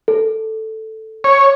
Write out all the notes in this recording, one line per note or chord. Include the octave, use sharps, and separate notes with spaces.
A4
C#5